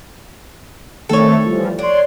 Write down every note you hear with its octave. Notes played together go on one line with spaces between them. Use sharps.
D#3 A3 C4 A4 C#5
E3 F3 G3
D4 C#5 C6